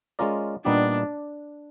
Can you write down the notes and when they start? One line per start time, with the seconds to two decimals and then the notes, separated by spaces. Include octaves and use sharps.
0.19 G#3 C#4 F4 A#4 D5
0.65 A#2 G3 B3 D4 D#4 G4